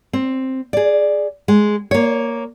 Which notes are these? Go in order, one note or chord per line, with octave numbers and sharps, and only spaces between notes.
C4
G#4 D5
G#3
A#3 C#5